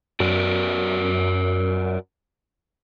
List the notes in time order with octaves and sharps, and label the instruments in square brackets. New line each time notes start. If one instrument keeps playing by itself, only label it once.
[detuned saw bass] F#2 [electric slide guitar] F#4 A#4 D5